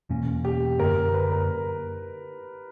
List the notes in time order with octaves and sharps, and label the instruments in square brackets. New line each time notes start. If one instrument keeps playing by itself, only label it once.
[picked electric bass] E2 B2 A#3 C#4
[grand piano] G4
[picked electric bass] F#2 D3 A#3 [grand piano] A#4
[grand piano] B4
A#4